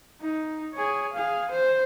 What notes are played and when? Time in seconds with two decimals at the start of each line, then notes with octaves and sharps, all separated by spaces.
0.21 D#4
0.74 G#4 C#5
1.13 G#4 F5
1.51 C5